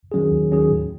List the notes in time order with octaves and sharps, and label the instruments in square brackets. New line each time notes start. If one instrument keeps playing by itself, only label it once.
[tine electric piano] D#3 F#3 C#4 G#4
D#2
D#3 F#3 C#4 G#4
A2